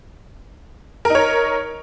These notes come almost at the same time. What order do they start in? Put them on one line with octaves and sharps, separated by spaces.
A#4 D#4 C#5